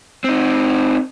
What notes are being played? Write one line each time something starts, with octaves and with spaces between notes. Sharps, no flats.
C4 D#4